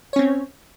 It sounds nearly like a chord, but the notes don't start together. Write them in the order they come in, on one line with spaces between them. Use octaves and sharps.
C#5 C#4 C4